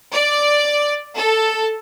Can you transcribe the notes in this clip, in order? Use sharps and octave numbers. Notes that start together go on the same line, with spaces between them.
D5
A4